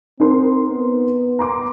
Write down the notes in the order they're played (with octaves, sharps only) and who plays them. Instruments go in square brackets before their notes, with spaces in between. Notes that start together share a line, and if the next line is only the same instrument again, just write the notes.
[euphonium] C4 [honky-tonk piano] D#4 A#4 C6
[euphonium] B3
[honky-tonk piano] A#5 C6 D6